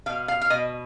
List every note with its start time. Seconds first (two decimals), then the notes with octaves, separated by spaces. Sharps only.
0.06 B2 F5
0.28 F5
0.42 F5
0.50 B2 D#5